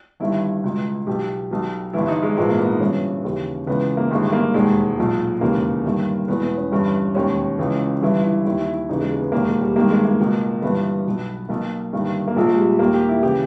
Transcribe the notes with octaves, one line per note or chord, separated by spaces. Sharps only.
G1 G2 D#3 E4
C#2 B2
B1 B2 G4
B1 B2
G1 G2 E3 E4
D#4
G#3
A#1 G#2 E3 G#3
A#3
B3
D#4
G1 G2 E3 C#4
D#2 C#3 E3
C#2 C#3 E3 B3
A#3
G1 G2 D#3 G#3
A#3
E1 D#2 D#3 G#3
B1 A#2
E1 D#2 C#3 E3 A#3
G1 G2 D#3
E1 E2 B2 B3
B3
C#4
G1 G2 E3
E1 D#2 D#3 C#4
C#2 C#3 E3
G1 G2 E3 E4
E4
D#2 D#3 E4
E4
E4
D#2 C#3 E3 D#4
G#3
G#3
B3
E1 D#2 D#3 A#3
G#3
G3
G#1 G2 D#3 A#3
G#3
A#3
C#2 B2
G1 G2 E3 B3
B1 B2
B1 B2 A#3
G1 G2 D#3
A#3
A#1 A#2 G#3
G#3
G3
D#2 D#3 A#3
G4
E4
C#3 E3 G4